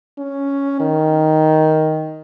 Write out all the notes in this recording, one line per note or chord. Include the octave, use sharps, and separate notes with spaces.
C#4
D#3